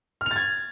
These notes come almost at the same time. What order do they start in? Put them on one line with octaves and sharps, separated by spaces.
F6 F7 A6 G#6